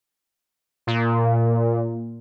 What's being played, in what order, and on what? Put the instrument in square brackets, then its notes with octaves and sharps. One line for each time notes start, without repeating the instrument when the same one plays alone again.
[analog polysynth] A#2